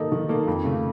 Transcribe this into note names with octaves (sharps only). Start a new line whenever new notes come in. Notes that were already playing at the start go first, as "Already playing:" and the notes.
Already playing: D#3 A#3 D#4 A4
D#3
A#3 D#4 A4
F2
C#3 A3